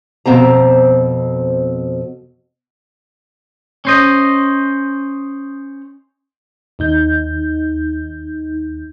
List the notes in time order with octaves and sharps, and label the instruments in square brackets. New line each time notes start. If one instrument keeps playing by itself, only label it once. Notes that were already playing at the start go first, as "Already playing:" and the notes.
[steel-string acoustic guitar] F2 B2 C4 A#5
[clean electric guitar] C#4 C5 D#5
[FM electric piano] D#2 D#4 G6